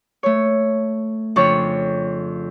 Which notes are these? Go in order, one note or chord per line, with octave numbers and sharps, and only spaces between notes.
A3 C#5
F2 C#3 D4 C#5 C#6